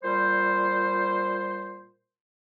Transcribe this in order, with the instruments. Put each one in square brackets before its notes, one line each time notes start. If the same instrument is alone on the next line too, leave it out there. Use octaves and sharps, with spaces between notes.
[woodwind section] A#2 G3 C5